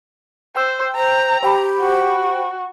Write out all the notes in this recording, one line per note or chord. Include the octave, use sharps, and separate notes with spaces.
C5 G5 E6
C5 A#5
G4 C5 G5 B5
F#4